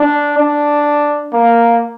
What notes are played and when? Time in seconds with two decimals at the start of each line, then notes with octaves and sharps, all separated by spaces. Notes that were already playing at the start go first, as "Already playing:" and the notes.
Already playing: D4
0.38 D4
1.33 A#3